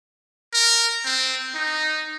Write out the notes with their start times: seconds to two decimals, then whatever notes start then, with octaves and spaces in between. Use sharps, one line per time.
0.54 A#4
1.05 C4
1.55 D#4